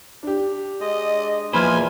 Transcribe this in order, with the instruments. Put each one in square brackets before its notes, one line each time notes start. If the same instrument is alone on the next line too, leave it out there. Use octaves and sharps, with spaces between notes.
[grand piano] D4 G4
[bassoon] G#3 [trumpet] D#5
[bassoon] E2 [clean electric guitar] F3 A#3 C5 [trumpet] G#5 [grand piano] B5 F6 G#6